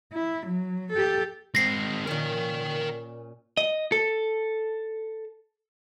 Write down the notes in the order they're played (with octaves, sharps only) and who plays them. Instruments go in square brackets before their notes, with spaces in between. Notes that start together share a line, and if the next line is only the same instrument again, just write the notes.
[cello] E4
F#3
G4 A4
[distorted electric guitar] G#3 C4 [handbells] A#6 C7
[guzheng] A#2 C#4 [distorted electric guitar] A#4 G5
[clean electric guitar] D#5
A4